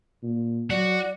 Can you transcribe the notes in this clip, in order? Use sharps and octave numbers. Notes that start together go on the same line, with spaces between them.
A#2
F#3 F#4 D5